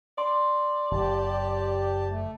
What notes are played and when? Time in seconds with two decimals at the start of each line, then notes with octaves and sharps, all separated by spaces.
0.18 D5 C6
0.91 F#1 G4 A5
2.09 A3